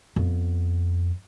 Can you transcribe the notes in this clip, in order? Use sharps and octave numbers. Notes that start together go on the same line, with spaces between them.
F2 B3